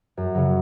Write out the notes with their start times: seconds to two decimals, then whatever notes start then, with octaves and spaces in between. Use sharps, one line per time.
0.17 F#2
0.35 C#3 F#3